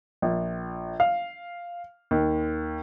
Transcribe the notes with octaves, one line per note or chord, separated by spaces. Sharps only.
A#1
F5
D#2